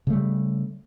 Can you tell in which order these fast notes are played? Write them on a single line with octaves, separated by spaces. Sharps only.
C#3 A3 G3